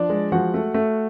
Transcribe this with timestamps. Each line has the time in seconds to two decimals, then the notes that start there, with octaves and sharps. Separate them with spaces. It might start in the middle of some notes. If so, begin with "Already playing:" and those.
Already playing: F3 D4 D5
0.10 G#3
0.32 F3 F#4 F#5
0.54 A3
0.74 A3